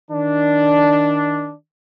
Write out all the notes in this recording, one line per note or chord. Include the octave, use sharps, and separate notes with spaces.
D#3 D4